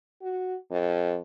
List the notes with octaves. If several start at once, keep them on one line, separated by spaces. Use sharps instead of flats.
F#4
F2